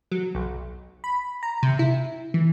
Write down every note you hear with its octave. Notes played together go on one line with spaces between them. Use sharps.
F#3
B1
B5
A#5
C3
E4
E3